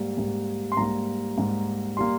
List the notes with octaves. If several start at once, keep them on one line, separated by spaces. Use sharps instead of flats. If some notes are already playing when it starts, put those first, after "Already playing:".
Already playing: G#2 G3 A#3
G#2 G3 A#3
C6
G#2 G3 A#3 A#5
G#2 G3 A#3
G3 A#3 C6